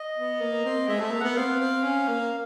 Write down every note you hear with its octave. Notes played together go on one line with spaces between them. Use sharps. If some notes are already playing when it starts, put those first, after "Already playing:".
Already playing: D#5
B3
A#3
C4
G#3 E5
A3 E5
A#3
B3 F#5
C4 F5
C4
C#4
A#3